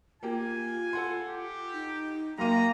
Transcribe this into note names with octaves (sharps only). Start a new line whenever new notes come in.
A#3 F4 G4 G#5
A4 F#5 C6
G4
D#4
F#2 A#3 G5 A#5 C6 D#7